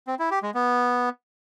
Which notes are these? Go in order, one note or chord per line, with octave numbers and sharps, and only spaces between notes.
C4
E4
G4
G#3
B3